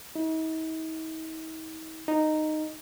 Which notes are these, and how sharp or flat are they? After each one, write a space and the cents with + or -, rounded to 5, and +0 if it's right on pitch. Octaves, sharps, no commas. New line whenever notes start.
D#4 +45
D#4 -10